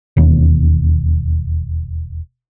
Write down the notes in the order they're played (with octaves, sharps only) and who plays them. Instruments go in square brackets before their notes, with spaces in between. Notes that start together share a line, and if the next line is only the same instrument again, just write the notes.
[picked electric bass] E1 D#2